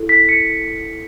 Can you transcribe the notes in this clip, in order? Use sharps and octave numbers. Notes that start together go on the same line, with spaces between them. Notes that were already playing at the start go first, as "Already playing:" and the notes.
Already playing: E4 A4
B6
C#7